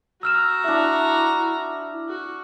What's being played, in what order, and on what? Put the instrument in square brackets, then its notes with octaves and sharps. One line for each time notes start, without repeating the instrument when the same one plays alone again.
[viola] F#4 A#5 [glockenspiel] E6 F6 E7
[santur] D4 E5 [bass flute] E4
[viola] F#4